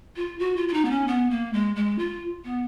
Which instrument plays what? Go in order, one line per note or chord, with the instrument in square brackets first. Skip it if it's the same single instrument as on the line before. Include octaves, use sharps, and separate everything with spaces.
[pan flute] F4
F#4
F4
F4
D#4
B3
C#4
B3
A#3
G#3
G#3
F4
B3